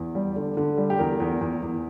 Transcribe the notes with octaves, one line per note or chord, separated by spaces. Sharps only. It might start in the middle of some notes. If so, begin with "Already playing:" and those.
Already playing: E2
G3
D3
D3
G3
G4
E2 A#4
E2
E2
E2